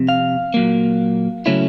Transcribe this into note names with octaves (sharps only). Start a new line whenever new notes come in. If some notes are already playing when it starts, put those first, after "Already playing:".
Already playing: F2 C3
F5
A#2 F#3 A#3
C#3 F#3 A3 C#4 E4